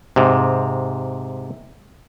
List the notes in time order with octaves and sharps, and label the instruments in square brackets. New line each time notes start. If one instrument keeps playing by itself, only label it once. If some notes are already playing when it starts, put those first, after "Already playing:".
[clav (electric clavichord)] G#2 C3